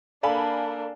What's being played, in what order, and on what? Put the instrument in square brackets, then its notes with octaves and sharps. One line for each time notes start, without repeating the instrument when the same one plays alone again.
[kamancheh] A#3 D4 [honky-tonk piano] A4 G#5 B5 [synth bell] D5 F5 A5